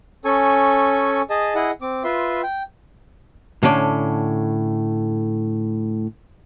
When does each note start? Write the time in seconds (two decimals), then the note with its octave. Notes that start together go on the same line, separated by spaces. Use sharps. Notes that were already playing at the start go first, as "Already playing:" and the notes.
0.25 C#4 A4 G#5 C#6
1.30 G#4 D#5 A5
1.55 E4 G#4 D#5 F#5
1.82 C4 D6
2.04 F4 B4 E5 C6
2.43 G5
3.63 A2 D3 C#4 D5